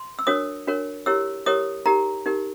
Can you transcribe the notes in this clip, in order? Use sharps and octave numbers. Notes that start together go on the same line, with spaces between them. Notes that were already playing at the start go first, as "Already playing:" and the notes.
Already playing: C6
E6
D4 F#4 A#4 C#5 D#6
D4 F#4 A#4 C#5
E4 G4 A#4 C#5 E6
E4 G4 A#4 C#5 D#6
D#4 G4 A#4 A#5
D#4 G4 A#4